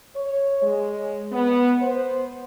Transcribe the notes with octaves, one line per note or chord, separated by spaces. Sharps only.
C#5
G#3
B3
C5